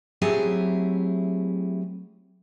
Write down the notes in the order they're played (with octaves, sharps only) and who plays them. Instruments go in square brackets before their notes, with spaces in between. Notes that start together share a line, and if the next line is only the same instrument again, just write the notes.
[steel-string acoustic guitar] F#3 A3 C4 E4 G4 G#4